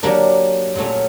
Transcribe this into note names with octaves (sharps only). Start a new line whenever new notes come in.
F#3 A#3 D4 G4 A#4
A#2 F#3 A3 C#4